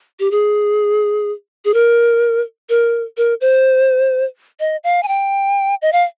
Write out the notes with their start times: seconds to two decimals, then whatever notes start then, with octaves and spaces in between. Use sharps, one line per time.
0.20 G4
0.31 G#4
1.65 G#4
1.74 A#4
2.69 A#4
3.17 A#4
3.41 C5
4.60 D#5
4.84 F5
5.03 G#5
5.08 G5
5.82 D#5
5.93 F5